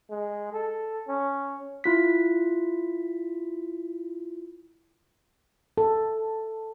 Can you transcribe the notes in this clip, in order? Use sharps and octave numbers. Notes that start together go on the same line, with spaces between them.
G#3
A4
C#4
E4 F4 B6
A4